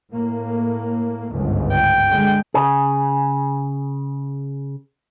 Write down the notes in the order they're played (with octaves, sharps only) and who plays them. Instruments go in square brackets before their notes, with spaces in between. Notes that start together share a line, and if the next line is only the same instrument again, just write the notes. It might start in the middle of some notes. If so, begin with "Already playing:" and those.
[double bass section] A2 A#3
G1 C#2 G#2
[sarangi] G5
[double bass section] D3 G#3
[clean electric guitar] C#3 G#4